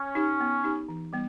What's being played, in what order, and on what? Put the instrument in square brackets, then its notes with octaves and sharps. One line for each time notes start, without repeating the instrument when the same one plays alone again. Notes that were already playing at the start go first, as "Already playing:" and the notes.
Already playing: [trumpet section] C#4
[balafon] D#4 G4
B3
D#4 G4
E3
G3 B3